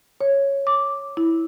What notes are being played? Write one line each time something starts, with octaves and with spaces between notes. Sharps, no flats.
C#5
D6
E4